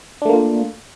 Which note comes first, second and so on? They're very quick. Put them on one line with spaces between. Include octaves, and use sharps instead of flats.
D4 A3 A#3 F4